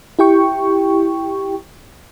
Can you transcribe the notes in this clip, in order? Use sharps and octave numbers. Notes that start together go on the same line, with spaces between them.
E4 G4 G5 C#6